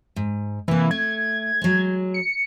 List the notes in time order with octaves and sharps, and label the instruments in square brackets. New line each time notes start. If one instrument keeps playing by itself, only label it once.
[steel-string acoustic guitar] G#2
[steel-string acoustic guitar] C3 A#3 [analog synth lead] E3
[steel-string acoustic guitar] A3 [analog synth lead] G#6
[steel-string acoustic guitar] F#3 G#3
[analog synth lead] C#7